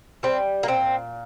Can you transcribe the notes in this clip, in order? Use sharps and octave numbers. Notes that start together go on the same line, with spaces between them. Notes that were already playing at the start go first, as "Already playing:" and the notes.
G3 C4
A#3
A#2 C4